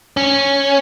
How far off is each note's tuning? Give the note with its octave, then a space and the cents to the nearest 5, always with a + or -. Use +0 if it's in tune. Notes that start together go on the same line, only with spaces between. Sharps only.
C#4 -5